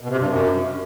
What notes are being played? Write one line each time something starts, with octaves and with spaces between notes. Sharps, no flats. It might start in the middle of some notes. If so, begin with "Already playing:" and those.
B2
C3
G2
F#2